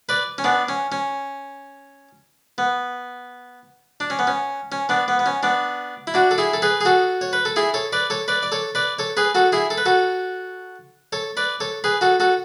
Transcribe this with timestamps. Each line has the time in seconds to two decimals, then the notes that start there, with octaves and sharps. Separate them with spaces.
0.09 B4 D5
0.38 C#4
0.44 B3 D4
0.69 C#4
0.92 C#4
2.58 B3
4.00 D4
4.10 C#4
4.19 B3
4.27 C#4
4.72 C#4
4.89 B3 D4
5.08 B3
5.19 B3
5.26 C#4
5.43 B3 D4
6.07 E4
6.14 D4 F#4
6.31 A4
6.38 E4 G#4
6.53 A4
6.62 G#4 B4
6.81 G#4
6.85 F#4 A4
7.21 C#5
7.33 B4
7.45 A4
7.56 E4 G#4
7.74 A4 C#5
7.92 B4 D5
8.10 A4 C#5
8.28 B4 D5
8.43 D5
8.52 A4 C#5
8.75 B4 D5
8.99 A4 C#5
9.17 G#4 B4
9.35 F#4 A4
9.52 E4 G#4
9.70 A4
9.78 B4
9.86 F#4 A4
11.12 A4 C#5
11.37 B4 D5
11.60 A4 C#5
11.84 G#4 B4
12.01 F#4 A4
12.20 F#4 A4